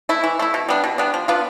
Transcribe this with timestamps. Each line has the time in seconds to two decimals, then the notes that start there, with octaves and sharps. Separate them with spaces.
0.09 A3 E4
0.24 E3
0.39 A3 E4
0.54 B2
0.69 G3 B3 D4
0.84 B2
0.98 G3 B3 D4
1.14 F3
1.28 B3 D4 F4